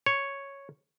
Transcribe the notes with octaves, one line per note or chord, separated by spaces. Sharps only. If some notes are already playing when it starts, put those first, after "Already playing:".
C#5